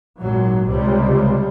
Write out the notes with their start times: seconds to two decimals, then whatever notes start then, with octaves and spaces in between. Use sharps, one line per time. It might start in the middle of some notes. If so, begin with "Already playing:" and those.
0.20 G#1 A#2 F#3
0.67 C#2 C3 G3